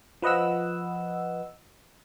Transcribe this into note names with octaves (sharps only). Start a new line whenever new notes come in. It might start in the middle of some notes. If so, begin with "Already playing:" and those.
F3 B4 D#5 F#5 E6